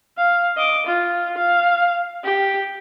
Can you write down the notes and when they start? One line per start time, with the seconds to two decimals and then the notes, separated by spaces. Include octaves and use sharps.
0.17 F5
0.57 D#5 D6
0.86 F4
1.37 F5
2.24 G4